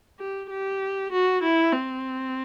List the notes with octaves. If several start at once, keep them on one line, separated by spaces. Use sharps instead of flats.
G4
G4
F#4
E4
C4